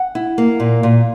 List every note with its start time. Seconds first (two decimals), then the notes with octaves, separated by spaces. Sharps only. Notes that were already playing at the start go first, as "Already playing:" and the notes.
Already playing: F#5
0.15 E4
0.38 A#3
0.60 A#2
0.83 A#2